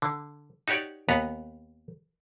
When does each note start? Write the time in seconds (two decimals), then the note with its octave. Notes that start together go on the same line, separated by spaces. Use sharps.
0.02 D3
0.68 D#4 F#4 G4 C#5 D5
1.09 D#2 B3 B4 F#5 A#5